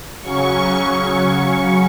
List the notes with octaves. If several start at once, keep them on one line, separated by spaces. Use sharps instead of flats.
C#3 F#3 C#4 C#6